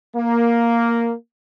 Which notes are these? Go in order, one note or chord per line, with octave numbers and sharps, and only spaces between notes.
A#3